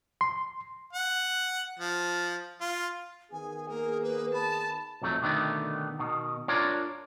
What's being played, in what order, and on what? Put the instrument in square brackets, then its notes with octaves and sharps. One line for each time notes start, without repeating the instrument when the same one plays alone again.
[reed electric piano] C6
[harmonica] F#5
F3
F4
[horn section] D#3 B3 G#4 [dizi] G#5
[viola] A#3 [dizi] A#4
[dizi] B4
[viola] A5 [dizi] B5
[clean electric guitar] B1 F2 F#3 A3
B2 D3 D#3 A3 B3
B2 D#3
D4 F4 A#4 C#5 D5